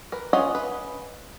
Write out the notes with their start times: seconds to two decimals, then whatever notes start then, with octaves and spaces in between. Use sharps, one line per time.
0.12 A#4 B4
0.33 C#4 F4 D#5 F#5 G#5
0.55 B4